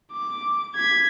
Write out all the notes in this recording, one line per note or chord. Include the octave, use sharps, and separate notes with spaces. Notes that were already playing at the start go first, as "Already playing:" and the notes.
D6
G#6 B6